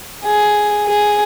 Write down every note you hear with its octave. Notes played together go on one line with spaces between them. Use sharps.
G#4
G#4